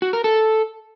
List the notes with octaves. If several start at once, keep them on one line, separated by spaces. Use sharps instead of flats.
F#4
A#4
A4